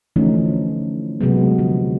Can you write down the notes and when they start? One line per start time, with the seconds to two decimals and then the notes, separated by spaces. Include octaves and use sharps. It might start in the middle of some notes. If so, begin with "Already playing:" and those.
0.16 D3 E3 F3 A3 C#4 D#4
1.21 C3 F#3 G#3 B3
1.58 D3 F3